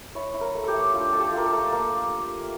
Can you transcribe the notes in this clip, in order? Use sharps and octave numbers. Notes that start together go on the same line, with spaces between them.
E4 C#5
E4
A#4
A3
G4 A4
A3
D4 F4
A3 A4
G4
F4 A#4
A4
A3
A#3 A#4